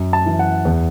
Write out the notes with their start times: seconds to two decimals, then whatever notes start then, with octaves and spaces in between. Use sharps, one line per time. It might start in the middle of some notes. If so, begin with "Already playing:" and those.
Already playing: F#2
0.13 A5
0.26 E3
0.39 F#5
0.65 E2